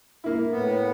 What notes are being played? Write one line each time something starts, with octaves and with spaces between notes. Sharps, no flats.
A#3 E4
A2 B3